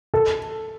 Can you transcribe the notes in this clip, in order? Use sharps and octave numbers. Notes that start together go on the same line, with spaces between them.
A4